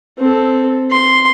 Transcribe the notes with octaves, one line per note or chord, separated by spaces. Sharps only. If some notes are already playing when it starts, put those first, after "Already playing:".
C4 A4
C6